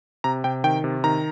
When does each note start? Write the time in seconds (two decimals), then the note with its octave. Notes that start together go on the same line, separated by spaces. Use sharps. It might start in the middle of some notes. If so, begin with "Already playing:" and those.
0.24 C3 A#5
0.44 C3 G5
0.64 D#3 G5
0.84 C3
1.04 D#3 A#5